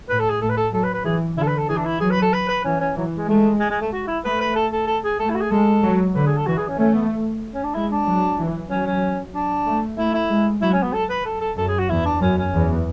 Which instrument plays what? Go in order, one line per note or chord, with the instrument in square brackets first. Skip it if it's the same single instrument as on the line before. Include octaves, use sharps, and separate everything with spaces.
[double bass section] A2 [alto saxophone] B4
[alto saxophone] A4
G#4
[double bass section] A2 [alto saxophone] A4
[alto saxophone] B4
A4
[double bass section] F#3 [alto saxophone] A4
[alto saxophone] B4
B4
[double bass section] E3 [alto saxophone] G#4
[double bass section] D3 [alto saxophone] E4
[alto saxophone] A4
B4
A4
[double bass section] E3 [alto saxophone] G#4
[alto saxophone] D4
E4
[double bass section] F#3 [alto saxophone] G#4
[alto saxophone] B4
A4
B4
B4
[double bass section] E3 [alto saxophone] C#4
[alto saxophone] C#4
[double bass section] E3 [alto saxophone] F#3
[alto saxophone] G#3
[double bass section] G#3 [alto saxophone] A3
[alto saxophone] G#3
G#3
A3
F#4
E4
[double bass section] A3 [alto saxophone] B4
[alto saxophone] B4
A4
A4
A4
G#4
[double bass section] A3 [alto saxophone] A4
[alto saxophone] E4
F#4
G#4
[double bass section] G#3 [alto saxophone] A4
[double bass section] F#3
[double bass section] D3 [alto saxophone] B4
[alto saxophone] G#4
A4
[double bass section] E3 [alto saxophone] F#4
[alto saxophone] G#4
C#4
[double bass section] A3 [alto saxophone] C#4
[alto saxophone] B3
C#4
D4
[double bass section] G#3 [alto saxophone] E4
[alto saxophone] D4
[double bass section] F#3
E3
[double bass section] F#3 [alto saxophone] C#4
[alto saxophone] C#4
D4
[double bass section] A3
[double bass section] A3 [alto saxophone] E4
[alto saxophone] E4
[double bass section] G#3
[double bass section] F#3 [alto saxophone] E4
[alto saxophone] C#4
B3
A4
B4
A4
A4
[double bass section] F#2 [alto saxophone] A4
[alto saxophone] G#4
F#4
[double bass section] E2 [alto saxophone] E4
[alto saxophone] D4
[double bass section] F#2 [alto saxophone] C#4
[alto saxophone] C#4
[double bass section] E2